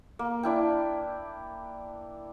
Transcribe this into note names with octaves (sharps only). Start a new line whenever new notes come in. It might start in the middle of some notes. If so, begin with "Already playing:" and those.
A#3
D4 E4 G5